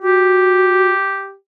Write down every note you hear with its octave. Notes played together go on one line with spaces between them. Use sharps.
F#4 G4